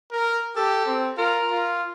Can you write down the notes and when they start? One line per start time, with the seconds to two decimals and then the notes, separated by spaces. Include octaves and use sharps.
0.12 A#4
0.56 G4 A4
0.86 C4
1.18 F4 A#4
1.51 F4